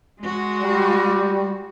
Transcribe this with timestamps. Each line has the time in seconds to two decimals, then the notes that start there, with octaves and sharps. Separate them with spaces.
0.21 G#3 F#4
0.61 G3